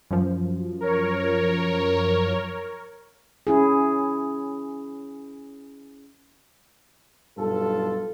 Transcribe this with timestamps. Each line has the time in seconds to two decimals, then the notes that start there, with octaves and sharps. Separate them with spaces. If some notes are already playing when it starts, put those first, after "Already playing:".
0.11 F#2 F3
0.80 A#4 C#5
3.47 C#4 E4 G#4
7.37 B1 G2 F4 A4